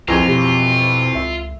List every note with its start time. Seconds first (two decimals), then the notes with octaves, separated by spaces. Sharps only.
0.08 C2 F2 E3 C4 F4 G#4 G#5 A#5
0.28 B2 G4
1.15 C#2 E5